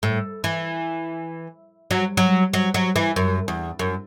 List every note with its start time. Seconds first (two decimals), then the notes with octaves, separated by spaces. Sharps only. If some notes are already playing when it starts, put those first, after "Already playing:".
0.03 A2
0.44 E3
1.91 F#3
2.17 F#3
2.53 F#3
2.74 F#3
2.96 E3
3.16 F#2
3.48 E2
3.79 F#2